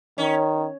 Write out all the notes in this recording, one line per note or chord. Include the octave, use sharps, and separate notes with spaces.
D#3 C#4